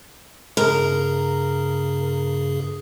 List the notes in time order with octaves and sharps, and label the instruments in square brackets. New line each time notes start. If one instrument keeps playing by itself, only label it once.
[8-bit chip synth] G2 C#3 G#4 [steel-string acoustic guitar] A#4